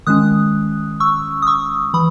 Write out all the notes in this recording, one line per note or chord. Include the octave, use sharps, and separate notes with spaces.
D#3 G#3 C#4 D#6 F#6
C#6 E6
D#6
C#6 E6
E3 B5 D#6